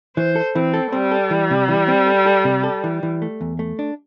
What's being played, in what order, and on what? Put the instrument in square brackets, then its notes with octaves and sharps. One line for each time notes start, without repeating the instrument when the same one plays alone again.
[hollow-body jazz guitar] E3 [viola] C5
[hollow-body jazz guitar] A4
[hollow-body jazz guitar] E3 [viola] C4
[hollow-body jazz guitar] A4
[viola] G3 [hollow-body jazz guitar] C4
[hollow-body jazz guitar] A4
E3
C3
E3
C4
A4
A4
C3
A4
E3
E3
A3
E2
A3
D4